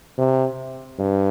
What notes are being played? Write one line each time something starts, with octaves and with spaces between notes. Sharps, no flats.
C3
G2